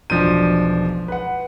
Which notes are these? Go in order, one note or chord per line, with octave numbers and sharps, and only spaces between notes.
E1 B1 F3 D4 G6 D#7
B4 F#5